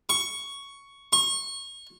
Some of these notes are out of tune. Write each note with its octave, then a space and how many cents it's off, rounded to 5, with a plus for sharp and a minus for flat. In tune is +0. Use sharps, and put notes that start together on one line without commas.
C#6 +5
C#6 -30